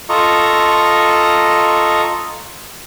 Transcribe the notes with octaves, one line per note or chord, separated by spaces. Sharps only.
F4 A4 D#5 A#5 C#6